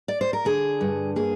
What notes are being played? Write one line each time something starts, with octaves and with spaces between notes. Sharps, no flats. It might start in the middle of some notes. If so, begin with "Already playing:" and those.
D5
C5
A#4
D3 G#4
G2
A#3 G#4